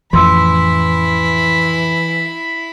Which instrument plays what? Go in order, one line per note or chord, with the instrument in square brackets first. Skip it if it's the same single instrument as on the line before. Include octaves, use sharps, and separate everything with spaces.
[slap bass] A1 F2 F3 [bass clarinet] E3 [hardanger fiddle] E4 B5 [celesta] C6 E6